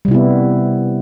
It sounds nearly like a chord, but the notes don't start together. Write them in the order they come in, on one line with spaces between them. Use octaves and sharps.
G3 C3 E4 B3